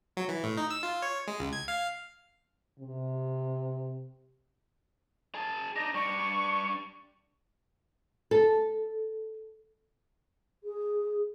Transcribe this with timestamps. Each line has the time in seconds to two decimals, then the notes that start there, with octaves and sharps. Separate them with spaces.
0.17 F#3
0.29 E3
0.44 A2
0.57 D#4
0.71 E6
0.83 F4
1.02 C#5
1.28 G#3
1.40 C#2
1.53 G#6
1.68 F5
2.80 C3
5.35 G#4 A5
5.76 D4 D#4 A#6
5.94 G3 D4 C#6
8.31 A4
10.64 G#4